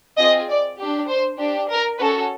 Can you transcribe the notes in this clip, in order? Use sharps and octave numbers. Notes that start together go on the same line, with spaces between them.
C4 F4 G#4 D#5
D5
D4 G4
C5
D4 G4
A#4
C#4 F#4 A4 B4